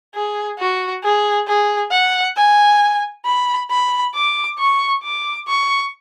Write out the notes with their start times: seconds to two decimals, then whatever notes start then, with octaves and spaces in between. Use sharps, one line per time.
0.15 G#4
0.59 F#4
1.03 G#4
1.48 G#4
1.92 F#5
2.37 G#5
3.26 B5
3.70 B5
4.14 D6
4.59 C#6
5.03 D6
5.48 C#6